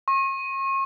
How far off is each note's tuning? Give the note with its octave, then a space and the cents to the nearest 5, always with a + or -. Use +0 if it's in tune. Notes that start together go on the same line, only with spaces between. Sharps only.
C#6 -40